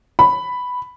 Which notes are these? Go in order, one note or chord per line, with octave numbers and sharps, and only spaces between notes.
B5